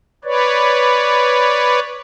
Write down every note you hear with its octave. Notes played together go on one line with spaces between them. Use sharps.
B4 C#5 D5